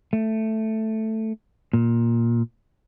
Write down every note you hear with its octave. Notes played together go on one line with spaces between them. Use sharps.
A3
A#2